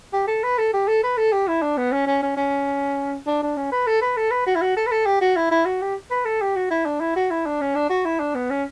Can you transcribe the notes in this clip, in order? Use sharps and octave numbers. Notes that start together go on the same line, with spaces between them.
G4
A4
B4
A4
G4
A4
B4
A4
G4
E4
D4
B3
C#4
C#4
C#4
C#4
D4
D4
C#4
B4
A4
B4
A4
B4
F#4
E4
F#4
A4
B4
A4
G4
F#4
E4
E4
F#4
G4
B4
A4
G4
F#4
E4
D4
E4
F#4
E4
D4
C#4
D4
F#4
E4
D4
B3
C#4